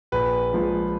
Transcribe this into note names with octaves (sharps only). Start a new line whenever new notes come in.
A#1 B4
A#2 F3 G#3